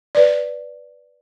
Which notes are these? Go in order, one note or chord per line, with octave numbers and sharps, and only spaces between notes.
B4 D5